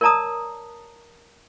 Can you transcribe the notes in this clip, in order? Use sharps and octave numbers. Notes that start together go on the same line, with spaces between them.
A#4 C#5 D5 A5 A#5 D#6